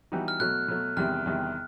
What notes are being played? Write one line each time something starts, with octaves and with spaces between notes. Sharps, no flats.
E3 G3 B3 D#4 F#4
F6
B2 F#3 A3 F#6
B2 F#3 A3
E2 C3 D#3 G3 F6
E2 C3 D#3 G3